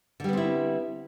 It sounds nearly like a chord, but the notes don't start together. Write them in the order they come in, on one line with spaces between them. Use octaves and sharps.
D3 G3 B3 C4 E4